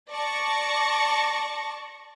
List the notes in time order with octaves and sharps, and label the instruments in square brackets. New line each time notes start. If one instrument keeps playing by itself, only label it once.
[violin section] D5 A5 C#6 A#6 C#7